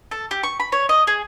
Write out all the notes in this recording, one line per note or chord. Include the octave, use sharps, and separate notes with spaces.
A4
G4
C#6
B5
C#5
D#5
G#4